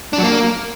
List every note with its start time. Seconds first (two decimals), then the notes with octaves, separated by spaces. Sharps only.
0.13 D4
0.18 F#3
0.23 A#3